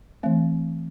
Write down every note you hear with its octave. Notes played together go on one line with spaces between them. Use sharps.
E3 A3 C4